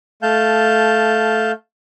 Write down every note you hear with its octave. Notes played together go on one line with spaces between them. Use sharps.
A3 F5 A5 G6